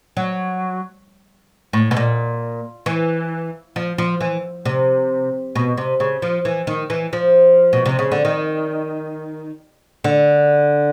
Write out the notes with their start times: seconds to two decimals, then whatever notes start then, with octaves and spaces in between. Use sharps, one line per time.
0.17 F#3
1.73 A2
1.91 B2
1.97 A#2
2.86 E3
3.76 F3
3.98 F3
4.21 E3
4.66 C3
5.55 B2
5.77 C3
6.00 C#3
6.22 F3
6.45 E3
6.67 D#3
6.90 E3
7.13 F3
7.73 B2
7.86 C3
7.99 C#3
8.12 D3
8.25 D#3
10.04 D3